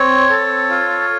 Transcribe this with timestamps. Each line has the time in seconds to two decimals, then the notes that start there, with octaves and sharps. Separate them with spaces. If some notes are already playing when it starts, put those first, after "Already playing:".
Already playing: C4 C#5
0.30 A4
0.69 F4